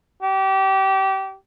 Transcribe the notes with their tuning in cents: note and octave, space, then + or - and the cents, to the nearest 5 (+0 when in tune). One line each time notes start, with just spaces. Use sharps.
G4 -25